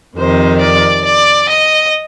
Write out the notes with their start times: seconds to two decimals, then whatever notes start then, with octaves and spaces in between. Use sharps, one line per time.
0.16 F2 C3 D#3 C5
0.60 D5
1.04 D5
1.48 D#5